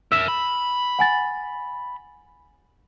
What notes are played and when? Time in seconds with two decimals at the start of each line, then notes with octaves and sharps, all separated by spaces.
0.12 A#4 E5 E6 E7
0.28 B5
0.99 F#5 G#5 A6